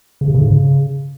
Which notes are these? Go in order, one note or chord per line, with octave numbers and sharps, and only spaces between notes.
C#3
C3
C#3
G#2
C#3